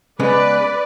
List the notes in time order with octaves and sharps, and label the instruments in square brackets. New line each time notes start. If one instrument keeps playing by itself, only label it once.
[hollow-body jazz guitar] C#3 G#3 B3 [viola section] B4 D5